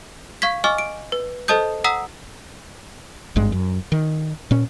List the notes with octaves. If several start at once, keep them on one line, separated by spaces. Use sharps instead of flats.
F5 C#6 G#6 B6
D#5 G#5 C#6 D6 F6
D7
B4
A4 C5 D#5 A5 D#6 G6
F#5 A#5 D#6 E6 B6 E7
G#1 G2 G#3
F#2
D#3
A#2 C#4